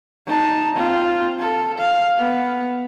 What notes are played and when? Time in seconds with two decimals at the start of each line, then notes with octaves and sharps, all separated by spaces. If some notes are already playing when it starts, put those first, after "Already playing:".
0.27 D#4 A5
0.76 C4 F4
1.39 A4
1.78 F5
2.17 B3